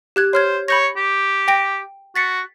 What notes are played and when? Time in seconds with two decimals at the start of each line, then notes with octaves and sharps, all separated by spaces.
0.16 G4 F#6 G#6
0.33 C5 C#5 F6 G#6
0.68 C#5 B5 G6 A#6
0.97 G4
1.48 G5 A#6 D7
2.16 F#4 A6 B6 C#7